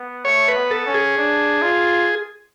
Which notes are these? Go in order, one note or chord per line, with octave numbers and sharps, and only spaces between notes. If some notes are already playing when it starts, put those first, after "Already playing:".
Already playing: B3
A3 C#5
B4
B3
A4
C#4
G#4
D4
F4